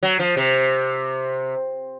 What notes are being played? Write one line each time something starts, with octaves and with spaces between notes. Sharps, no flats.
F#3
F3
C3